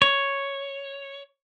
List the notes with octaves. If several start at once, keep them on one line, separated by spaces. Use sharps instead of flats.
C#5